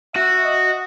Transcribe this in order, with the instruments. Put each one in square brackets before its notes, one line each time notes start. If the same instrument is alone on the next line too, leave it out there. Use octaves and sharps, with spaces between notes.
[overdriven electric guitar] F#4 [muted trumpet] E5
[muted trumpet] D#5